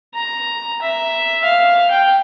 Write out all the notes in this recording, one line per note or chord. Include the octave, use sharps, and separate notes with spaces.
A#5
E5
F5
G5